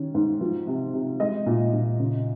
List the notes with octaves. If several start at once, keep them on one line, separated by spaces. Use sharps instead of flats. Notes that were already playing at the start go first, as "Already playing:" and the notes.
Already playing: D#3 C#4
G#2
F3
C3
C3
G#3 D#5
A#2
A#2
C#3